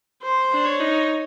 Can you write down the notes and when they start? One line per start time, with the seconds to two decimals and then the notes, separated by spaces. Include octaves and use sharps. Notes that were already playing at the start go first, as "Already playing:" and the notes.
0.23 C5
0.52 D4
0.66 C#5
0.80 D#4